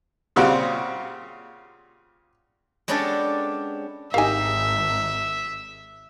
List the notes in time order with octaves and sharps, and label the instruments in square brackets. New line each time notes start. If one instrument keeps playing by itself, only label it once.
[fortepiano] A#2 C#3 G3 C4 F#4
[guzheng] G#3 B3 C#4 D4 G4 A4
[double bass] G#1 [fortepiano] D#4 G4 A#4 [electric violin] E5 [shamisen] F5 G#5